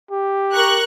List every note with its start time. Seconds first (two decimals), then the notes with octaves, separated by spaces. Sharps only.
0.11 G4
0.54 A#4 C#6 F#6